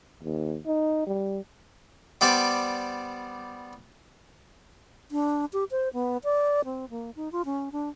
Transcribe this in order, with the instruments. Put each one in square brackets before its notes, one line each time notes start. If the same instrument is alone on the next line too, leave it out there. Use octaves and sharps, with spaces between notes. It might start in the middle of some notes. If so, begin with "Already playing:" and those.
[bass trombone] D#2
D#4
G3
[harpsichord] G3 B3 C5 D5
[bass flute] D4
G4
C5
B3
D5
C4
A#3
D#4
F4
C#4
D4